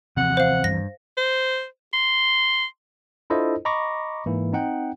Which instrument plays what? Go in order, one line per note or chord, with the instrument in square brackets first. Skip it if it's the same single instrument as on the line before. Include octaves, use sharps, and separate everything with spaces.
[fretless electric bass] C3 [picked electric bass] E3 F3 C4 [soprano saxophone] F#5
[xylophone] C5 F5
[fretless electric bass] G2 [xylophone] A#6
[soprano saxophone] C5
C6
[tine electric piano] D4 E4 F4 A4 C5 D#5
D#5 A#5 B5 C#6 D6 A#6
G#2 E3 A#3 E4
C4 D#4 F#5 G5